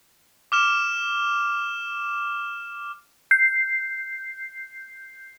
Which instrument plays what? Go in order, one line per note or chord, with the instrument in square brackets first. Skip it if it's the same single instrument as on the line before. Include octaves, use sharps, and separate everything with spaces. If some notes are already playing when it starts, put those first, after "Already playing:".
[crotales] D6 F6 E7
[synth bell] G6 C7